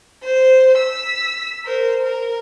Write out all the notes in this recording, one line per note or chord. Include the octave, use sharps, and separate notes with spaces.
C5
E6 B6
A#4 C5
A#4